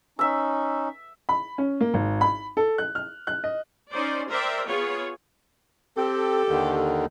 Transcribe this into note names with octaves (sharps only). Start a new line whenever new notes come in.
C#4 D#4 E5 E6
B5
C#4
A#3
G#1
B5
A4
F#6
F6
F#6
D#5
C#4 D#4 C5 D5
A#4 C5 D5 E5 G5
B3 F4 G#4 C#5
C4 G4 A4
D#2 D3 D#3